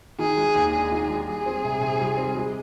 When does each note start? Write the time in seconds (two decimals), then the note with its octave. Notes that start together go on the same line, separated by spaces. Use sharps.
0.19 D#3 G#4
0.37 G#3
0.55 D#2
0.73 D4 G#4
0.92 D#3
1.10 G#3
1.28 G3 G#4
1.46 C4
1.64 C3
1.81 C3
2.00 G3
2.17 C4
2.35 G#3